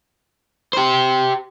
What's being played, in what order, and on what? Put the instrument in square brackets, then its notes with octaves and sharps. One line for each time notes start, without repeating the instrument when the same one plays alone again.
[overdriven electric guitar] G4 C5